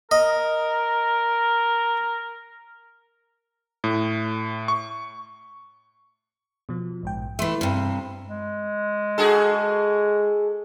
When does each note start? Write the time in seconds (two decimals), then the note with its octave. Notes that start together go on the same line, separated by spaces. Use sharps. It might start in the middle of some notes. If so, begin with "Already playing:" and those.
0.11 A#4 D#5
3.84 A2
4.68 C#6
6.69 B2 F3
7.03 A#1 G#2 G5
7.39 E3 A3 E5 C6
7.61 G2 C3
8.26 G#3
9.18 F#4 G#4 A4